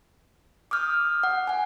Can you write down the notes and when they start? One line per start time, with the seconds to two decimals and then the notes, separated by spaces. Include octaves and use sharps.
0.71 D6 D#6 F6 G6
1.23 F#5
1.47 F#5 G#5